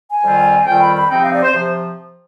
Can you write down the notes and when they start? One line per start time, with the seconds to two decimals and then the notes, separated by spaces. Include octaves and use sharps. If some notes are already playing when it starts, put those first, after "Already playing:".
0.08 G#5
0.22 F2 D#3 G3 C4 F4
0.66 F2 D#3 G3 C4 F4 G5
0.81 B5
0.96 B5
1.10 C3 F3 C4 D#4 G5
1.21 F5
1.32 D5
1.43 C5
1.53 C3 F3